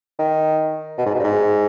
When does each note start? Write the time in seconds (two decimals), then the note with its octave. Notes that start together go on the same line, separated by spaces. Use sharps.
0.19 D#3
0.98 B2
1.06 G#2
1.15 B2
1.20 G2
1.24 G#2